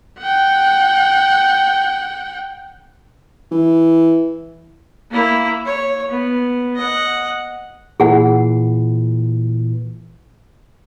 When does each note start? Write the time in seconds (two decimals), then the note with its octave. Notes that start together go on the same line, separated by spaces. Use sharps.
0.20 F#5 G5
3.51 E3
5.11 A#3 E4
5.66 C#5
6.09 B3
6.76 D#5 F#5
8.00 A#2 E3 G#4 F#5